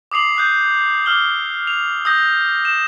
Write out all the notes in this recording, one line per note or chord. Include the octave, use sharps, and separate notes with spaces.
D6 D#6 C7 F7 F#7
D#6 F#6 G6
D6 E6 F6 F#7 G7
F7
D#6 E6 G6 A#6
E7